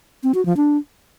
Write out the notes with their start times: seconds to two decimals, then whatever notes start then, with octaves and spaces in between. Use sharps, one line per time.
0.23 C4
0.34 F#4
0.46 F3
0.57 D4